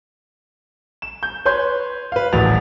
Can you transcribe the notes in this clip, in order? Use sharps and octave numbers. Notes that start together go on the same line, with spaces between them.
E7
G6
B4 C#5 C6 G6
B4 F5
D#1 A1 F#4 A6 F7